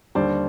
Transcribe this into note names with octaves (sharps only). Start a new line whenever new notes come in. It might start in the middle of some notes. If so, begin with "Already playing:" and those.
D#2 D3 G3 C5 D5